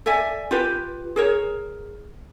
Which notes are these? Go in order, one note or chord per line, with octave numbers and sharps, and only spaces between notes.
A4 D5 E5 G#5
F4 G4 B4
G#4 A#4 C#5